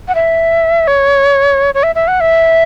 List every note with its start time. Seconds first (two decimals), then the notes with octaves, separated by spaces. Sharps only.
0.08 F#5
0.15 E5
0.87 C#5
1.75 C#5
1.83 E5
1.95 E5
2.08 F#5
2.20 E5